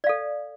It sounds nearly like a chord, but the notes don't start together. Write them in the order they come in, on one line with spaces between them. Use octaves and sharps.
D5 F5 A4